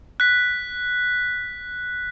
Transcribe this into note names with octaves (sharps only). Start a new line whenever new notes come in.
F#6 B6